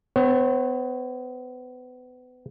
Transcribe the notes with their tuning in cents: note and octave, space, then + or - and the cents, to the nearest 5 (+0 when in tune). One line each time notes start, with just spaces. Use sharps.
B3 +30 C#5 -35